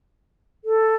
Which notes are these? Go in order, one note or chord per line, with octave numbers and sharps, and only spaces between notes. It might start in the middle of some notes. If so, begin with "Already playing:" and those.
A4